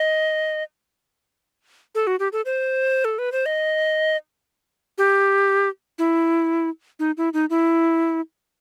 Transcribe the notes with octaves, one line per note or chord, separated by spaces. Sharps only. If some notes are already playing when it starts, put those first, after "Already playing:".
Already playing: D#5
A4
F#4
G4
A4
C5
A4
B4
C5
D#5
G4
E4
D#4
E4
D#4
E4